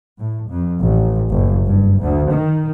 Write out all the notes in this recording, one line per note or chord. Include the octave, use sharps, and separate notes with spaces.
A2
F2
A1
F#1
G2
D2
D#3